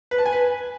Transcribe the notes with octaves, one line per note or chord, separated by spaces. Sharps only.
B4
A5
G#5
B4